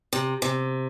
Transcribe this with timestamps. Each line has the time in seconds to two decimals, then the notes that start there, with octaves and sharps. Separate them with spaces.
0.13 C3
0.42 C3